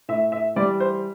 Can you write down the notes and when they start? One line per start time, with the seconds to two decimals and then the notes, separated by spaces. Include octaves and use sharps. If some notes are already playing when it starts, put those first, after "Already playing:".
0.08 A2 E5
0.32 E5
0.56 E3 G3 D5
0.80 C5